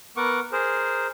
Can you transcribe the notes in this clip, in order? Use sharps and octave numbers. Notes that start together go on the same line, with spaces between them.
B3 A#4 F#5 C#6 D6
G#4 A#4 C5